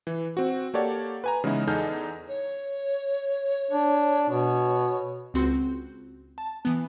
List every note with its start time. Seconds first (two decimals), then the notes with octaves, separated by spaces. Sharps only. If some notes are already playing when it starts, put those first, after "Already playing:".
0.07 E3
0.37 C4 F#4
0.74 A#3 G4 A4 C#5 D5 F#5
1.24 B4 G#5 A#5
1.44 C#3 E3 G#3 B3 D#4 E4
1.67 E2 D#4 G#4 A4 F6 G6
2.29 C#5
3.71 D4
4.30 B2 C#5
5.34 C#2 C4 F#4 C6 G6
6.38 A5
6.65 E3 B3